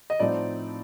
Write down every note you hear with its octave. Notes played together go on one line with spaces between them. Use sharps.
D#5
A2 F3 C4 D#4 D5